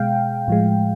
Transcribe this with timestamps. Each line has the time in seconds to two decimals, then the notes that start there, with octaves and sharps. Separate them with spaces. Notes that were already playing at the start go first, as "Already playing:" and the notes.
Already playing: B2 G#3 F5 G5
0.48 A2 F3 G#3